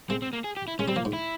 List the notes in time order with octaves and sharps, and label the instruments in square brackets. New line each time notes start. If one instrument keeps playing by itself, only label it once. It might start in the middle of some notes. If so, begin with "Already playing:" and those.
[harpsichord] G#3 [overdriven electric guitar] C4
[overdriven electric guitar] C4
A#3
G#4
G4
E4
[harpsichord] G#3 [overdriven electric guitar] C#4
[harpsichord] G3 [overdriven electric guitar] C4
[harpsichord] F3 [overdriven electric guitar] A#3
[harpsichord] G#2
[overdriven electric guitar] E4